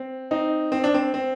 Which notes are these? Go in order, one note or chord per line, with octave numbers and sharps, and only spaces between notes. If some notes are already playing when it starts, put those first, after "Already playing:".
Already playing: C4
C4 D#4
C4
D4
C4
C4